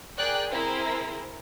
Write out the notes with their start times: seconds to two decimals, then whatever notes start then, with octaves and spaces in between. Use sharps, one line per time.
0.18 G#4 A#4 D5 G5 F#6
0.51 C4 E4 G#4 A#4 A#5 C6